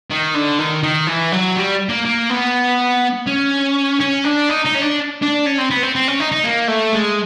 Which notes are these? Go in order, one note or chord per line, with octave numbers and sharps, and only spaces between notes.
D#3
D3
D#3
D#3
E3
F#3
G3
A#3
A#3
B3
C#4
C#4
D4
D#4
D#4
C#4
D4
D4
C#4
C4
B3
C4
C4
C#4
D#4
D#4
A#3
A3
G#3